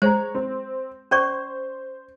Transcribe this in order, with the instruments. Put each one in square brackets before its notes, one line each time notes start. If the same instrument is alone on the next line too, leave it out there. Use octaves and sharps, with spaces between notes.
[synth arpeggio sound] G#3 [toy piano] C5 [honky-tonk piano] C#5 A#5
[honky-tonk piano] C4
[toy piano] C#4 D5 C#6 [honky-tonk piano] C5